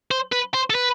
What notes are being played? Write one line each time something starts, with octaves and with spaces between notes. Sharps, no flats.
C5
B4
C5
A4
B4